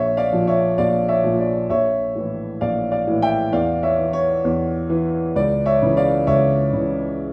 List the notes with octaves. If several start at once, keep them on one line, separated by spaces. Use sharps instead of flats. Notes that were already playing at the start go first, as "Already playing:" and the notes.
Already playing: A#1 C#5 E5
D5 F5
A#2 F3
C#5 E5
A#1 D5 F5
C#5 E5
A#2 F3
D5
A#1 C#5 E5
A2 E3
A#1 D5 F5
D5 F5
A2 E3
E5 G5
E2 D5 F5
C#5 E5
E3
C#5
E2
E3
C#2 D5
C#5 E5
C#3 E3
D5 F5
C#2 C#5 E5
C#3 E3